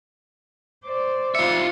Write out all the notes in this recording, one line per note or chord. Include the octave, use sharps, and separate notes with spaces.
C5 D5
F4 E5 C#7